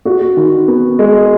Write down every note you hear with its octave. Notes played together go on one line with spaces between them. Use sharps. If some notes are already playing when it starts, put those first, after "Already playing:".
F#4
D#3
B3
G#3